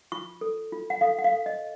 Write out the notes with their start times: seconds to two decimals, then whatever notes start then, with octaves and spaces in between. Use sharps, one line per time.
0.12 F4 C#6
0.41 A4
0.72 F4
0.90 F#5
1.01 A4 F5
1.18 F#5
1.24 F5
1.32 A4
1.46 D#5